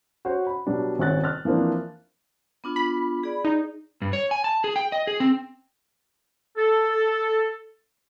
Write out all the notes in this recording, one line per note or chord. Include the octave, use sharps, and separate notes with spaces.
F#4 C5 C#5
B5
B2 F#3 G3 D4
D#1 G#1 C#4 F#6 A6
F6 F#6 A6
E3 F3 A#3 C4 D4
B3 D4 F4
B5
G#4 D5
D#4
G2
C#5
G#5
A5
G#4
G5
D#5
G#4
C4
A4